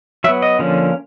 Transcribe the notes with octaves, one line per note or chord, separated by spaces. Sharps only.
F#3 B3 E5
D#5
D3 F3 A#3 C#4